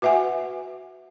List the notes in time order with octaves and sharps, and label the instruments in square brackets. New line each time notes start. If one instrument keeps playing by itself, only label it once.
[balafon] F#4 B4 E5 F#5 G#5